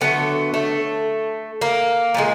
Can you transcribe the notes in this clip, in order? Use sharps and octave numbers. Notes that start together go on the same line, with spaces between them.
D3 F#3 A3 B3
A3
A#3
A#2 F3 G#3